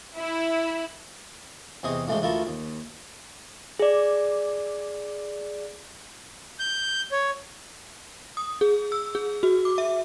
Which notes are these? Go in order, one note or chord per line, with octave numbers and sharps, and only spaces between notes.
E4
E2 C3 G#4 C5 D#5 C#6
A2 C#3 E3 G#3 A3 G4
D2 E4 F4 A#4 A5 C#6
D#2
G#4 D5
G6
C#5
D#6
G#4
E6
G#4
F#4
D6
E5